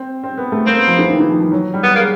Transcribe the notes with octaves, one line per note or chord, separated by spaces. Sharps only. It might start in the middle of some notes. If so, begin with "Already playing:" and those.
Already playing: C4
C4
B3
A3
A#3 C4
B3
F3
E3
D#3
E3
F3
F3
F#3
G3
B3
G#3 A#3